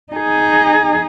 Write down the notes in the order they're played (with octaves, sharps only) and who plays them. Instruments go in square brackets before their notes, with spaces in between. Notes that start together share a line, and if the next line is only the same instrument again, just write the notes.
[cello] D#4 G#4